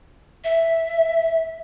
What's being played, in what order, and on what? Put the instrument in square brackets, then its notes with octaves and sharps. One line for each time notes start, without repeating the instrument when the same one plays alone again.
[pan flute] E5